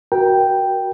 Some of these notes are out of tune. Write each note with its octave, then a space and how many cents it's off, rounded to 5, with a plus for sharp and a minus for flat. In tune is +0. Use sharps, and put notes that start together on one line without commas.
F#4 +10 A#4 +20 G5 +0